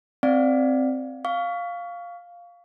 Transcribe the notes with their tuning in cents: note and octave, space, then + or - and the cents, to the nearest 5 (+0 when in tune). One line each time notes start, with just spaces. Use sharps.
C4 +0 D5 +0 F5 +0
F5 +0 C#6 +30